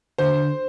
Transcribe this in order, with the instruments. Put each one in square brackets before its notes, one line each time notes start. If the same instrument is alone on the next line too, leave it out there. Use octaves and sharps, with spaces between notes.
[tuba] D3 [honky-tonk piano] C5